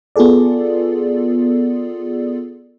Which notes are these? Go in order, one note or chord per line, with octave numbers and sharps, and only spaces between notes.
B3 F4 G#4 A4 D5